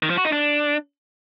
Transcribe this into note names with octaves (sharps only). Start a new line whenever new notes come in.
D#3
F3
F#4
D#4
D4